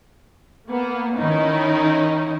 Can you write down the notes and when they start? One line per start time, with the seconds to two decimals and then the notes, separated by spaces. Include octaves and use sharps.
0.68 A#3 B3
1.17 D#3 C#4 D#4 E4